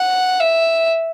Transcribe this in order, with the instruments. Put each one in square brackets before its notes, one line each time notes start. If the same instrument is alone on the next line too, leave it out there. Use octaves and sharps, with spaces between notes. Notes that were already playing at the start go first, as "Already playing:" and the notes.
Already playing: [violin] F#5
E5